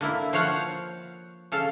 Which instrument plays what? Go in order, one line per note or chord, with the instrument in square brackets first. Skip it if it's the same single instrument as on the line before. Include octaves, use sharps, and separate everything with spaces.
[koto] D3 A#3 E4
F3 C5 C#5 F5 F#5
C#3 A4 F5